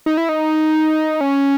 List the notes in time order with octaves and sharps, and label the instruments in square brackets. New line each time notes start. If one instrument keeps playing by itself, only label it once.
[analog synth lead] D#4
E4
D#4
C#4